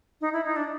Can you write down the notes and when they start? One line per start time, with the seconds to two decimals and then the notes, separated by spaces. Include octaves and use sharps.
0.21 D#4
0.33 E4
0.45 D#4
0.56 D4